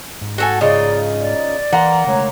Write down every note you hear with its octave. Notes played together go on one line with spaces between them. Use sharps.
G#2
F#4 A4 G#5
C#3 D#4 F4 D5
D5
E3 A#3 F#5 A#5 C6
C#3 G#3 A3 C#5